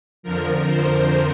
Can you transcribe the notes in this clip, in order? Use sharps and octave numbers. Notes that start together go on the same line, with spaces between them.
F2 D3 F3 A#4
C5